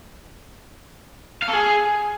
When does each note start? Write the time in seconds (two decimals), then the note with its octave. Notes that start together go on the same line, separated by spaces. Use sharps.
1.42 F5
1.48 A4
1.53 G#4